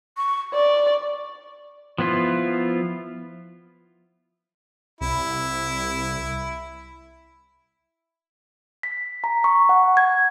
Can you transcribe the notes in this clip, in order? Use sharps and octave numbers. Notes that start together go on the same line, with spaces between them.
C#6
D5 C#6
F3 B3 E4 F4
C2 E4
B6
A#5
C#6
F#5
G#6